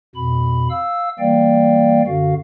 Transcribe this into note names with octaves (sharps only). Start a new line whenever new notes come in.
F2 B2 B5
F5 E6
E3 G3 A#3 D5 F5 G5
F#2 D3 F#4 F5